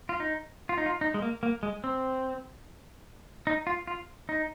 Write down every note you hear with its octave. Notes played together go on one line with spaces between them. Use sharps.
F4
D#4
F4
D#4
F4
D#4
G#3
A#3
A#3
G#3
C4
D#4
F4
F4
D#4